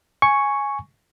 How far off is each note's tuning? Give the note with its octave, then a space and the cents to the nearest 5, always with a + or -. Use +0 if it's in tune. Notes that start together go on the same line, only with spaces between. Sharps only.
G#5 +0 C#6 +0